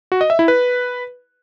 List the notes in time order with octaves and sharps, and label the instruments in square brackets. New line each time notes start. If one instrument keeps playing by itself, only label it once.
[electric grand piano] F#4
D#5
E5
E4
B4